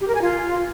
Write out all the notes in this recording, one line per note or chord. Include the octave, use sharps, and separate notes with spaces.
G4
A#4
G#5
F4